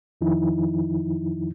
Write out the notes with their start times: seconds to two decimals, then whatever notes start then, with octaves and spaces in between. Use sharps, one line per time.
0.21 F2 D#3 F3 D#4 E4